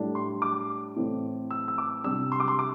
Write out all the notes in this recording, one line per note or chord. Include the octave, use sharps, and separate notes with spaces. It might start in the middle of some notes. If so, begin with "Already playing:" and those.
Already playing: A2 G3 D4
C6
D6
A2 E3 C4
E6
E6
D6
C3 G3 D4 E6
C6
D6
C6
D6